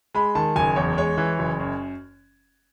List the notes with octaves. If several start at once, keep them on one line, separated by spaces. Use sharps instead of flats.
G#3 B5
D#3 A5
F#1 G#5
E2 C#5
G#3 C#5
E3
F#1
F#2